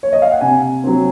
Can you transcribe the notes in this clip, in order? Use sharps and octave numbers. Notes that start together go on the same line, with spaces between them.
C#5
D#5
F5
F#5
C3 G#5
F#3 C4